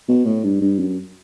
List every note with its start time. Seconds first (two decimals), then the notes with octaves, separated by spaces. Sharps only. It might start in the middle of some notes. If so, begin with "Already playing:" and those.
0.09 B2
0.25 A2
0.44 G2
0.61 G2
0.79 F#2